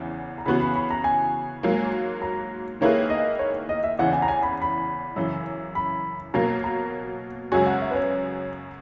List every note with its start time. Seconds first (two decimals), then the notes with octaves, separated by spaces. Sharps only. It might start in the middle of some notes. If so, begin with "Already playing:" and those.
Already playing: E2 C#3 E3
0.38 A#5
0.45 C#3 E3 B3 F#4 B5
0.60 B5
0.75 B5
0.90 A#5
1.04 G#5
1.63 G#2 F#3 A#3
2.22 A#5
2.81 D#3 A#3 E4 G#4 B4 C#5
3.10 D#5
3.39 C#5
3.69 D#5
3.84 E5
3.99 E2 C#3 E3 F#5
4.13 G#5
4.22 A#5
4.28 G#5
4.42 B5
4.62 B5
5.16 F#2 C#3 E3
5.75 B5
6.34 B2 F#3 A#3 A#5
6.64 A#5
7.52 F#2 C#3 G#3 C#4 F#4 G#5
7.66 F#5
7.82 E5
7.91 B4
7.96 C#5